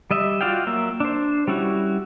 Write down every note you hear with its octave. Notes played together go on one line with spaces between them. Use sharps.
G3 D#5 E5
F4 F#4 D5 F5 G5
F#3 A#3 E5
D4 C5
G3 C#4 E4 F#4